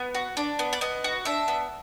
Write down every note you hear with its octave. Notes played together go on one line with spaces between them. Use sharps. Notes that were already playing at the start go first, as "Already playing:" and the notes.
Already playing: B3
F#4
D4 D5
B3
D5
B3 D#5
F#4
D4 E5
B3